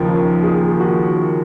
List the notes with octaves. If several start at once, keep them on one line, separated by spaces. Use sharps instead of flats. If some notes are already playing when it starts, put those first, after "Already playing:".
Already playing: D#2 C#3 F3 A#4
G#4
F#4